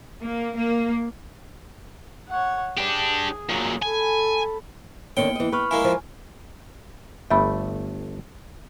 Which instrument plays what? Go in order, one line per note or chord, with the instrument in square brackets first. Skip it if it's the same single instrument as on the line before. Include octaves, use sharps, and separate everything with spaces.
[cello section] A#3
A#3
[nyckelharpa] C#5 F#5
[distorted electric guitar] D4 G4 [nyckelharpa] G#4
[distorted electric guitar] A#2 F#3
[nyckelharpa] A4 B5 [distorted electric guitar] G#5
[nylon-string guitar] D3 D#3 C#4 [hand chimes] A#3 B3 C#7 [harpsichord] G5
[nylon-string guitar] E3 D#5
[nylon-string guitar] B4 [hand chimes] B5 C#6 F6
[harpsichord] G#3 A#3 E4 [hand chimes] G#5
[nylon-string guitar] F3
[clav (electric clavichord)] G1 A3 G5 [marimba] E5 B5